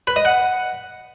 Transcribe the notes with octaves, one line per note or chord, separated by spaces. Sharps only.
B4
D#5
F#5